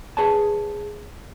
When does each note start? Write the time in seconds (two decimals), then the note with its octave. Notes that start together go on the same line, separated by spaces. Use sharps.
0.17 G#4 B4 C#5 G#5 A5